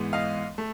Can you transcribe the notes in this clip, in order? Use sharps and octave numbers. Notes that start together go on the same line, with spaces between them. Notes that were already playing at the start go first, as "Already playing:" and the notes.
Already playing: G#2 E3 G#3 B3
D#5 F5
A3